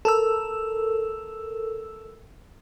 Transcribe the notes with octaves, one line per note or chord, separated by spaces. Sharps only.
A4 A#4 E6